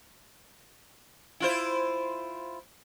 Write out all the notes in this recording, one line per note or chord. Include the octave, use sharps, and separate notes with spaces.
E4 F4 C5